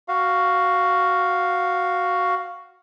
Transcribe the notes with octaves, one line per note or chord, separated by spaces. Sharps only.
F#4 F5